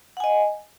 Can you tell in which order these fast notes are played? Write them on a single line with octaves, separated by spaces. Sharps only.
F#5 G#5 D#5